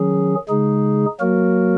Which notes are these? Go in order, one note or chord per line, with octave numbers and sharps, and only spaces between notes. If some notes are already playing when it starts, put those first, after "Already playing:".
Already playing: D#3 F#3 C#4 G#4
C#3 G#3 D#4 G#4
F#3 A#3 F#4 A#4